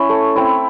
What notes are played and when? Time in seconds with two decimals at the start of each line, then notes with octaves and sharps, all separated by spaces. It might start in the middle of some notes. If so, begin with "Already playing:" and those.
Already playing: C#4 E4 C#6
0.09 A3
0.36 C4 E4